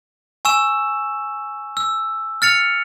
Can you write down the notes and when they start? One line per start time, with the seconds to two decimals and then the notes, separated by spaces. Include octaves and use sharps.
0.45 G#5 C#6 E6 E7
1.77 E6
2.42 F6 A6 C#7 F7